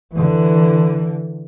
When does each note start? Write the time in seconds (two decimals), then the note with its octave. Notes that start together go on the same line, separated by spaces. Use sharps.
0.13 D3 E3